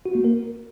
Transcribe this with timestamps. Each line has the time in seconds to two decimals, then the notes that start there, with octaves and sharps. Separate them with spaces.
0.06 F#4
0.15 A#3
0.24 A#4